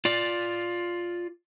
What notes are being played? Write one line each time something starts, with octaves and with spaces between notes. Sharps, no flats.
F4 D5